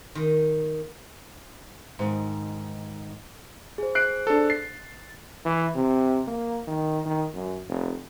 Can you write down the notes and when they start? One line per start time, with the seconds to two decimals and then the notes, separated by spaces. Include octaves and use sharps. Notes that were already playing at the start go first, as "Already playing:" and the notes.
0.15 D#3
1.99 G#2 D#3
3.78 G#4 C5
3.95 F#6 C7 D7
4.27 D4 A4
4.50 A6 C7
5.45 E3
5.75 C3
6.28 A#3
6.67 D#3
7.06 D#3
7.34 F#2
7.68 F1